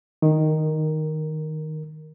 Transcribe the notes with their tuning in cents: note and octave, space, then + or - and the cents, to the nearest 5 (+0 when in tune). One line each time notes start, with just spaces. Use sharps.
D#3 +0 A#4 +0